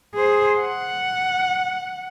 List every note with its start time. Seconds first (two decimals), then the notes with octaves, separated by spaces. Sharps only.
0.15 G#4 C5
0.61 F#5